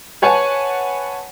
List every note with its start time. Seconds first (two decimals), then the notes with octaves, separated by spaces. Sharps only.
0.22 B4 C#5 F#5 G#5 A5